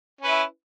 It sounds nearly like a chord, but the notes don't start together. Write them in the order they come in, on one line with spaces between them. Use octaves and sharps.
C#4 B4 E4